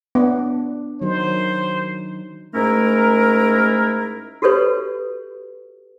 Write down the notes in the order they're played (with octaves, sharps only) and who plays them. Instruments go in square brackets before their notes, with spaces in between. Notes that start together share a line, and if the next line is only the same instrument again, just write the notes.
[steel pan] B3 [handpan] D4
[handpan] D#3 F#3 D#4 [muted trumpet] C5
[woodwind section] G#2 A3 C#4 E4 A#4
[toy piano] F#4 G4 A4 B4 C#5